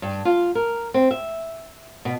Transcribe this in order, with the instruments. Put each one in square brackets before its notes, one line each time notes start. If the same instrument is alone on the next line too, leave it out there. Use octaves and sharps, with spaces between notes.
[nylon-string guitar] G2
F4
A#4
C4
E5
B2